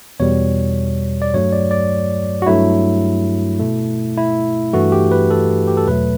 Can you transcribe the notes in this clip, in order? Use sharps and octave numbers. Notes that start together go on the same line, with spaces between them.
E2 B2 G3 C#5
D5
G2 F#3 A3 C#5
D5
D5
F#4
G2 F#3 A3 E4
B2 A3
E4
G2 E3 A3 F#4
G4
B4
A4
G4
A4
E2 B2 F#3 A3 B4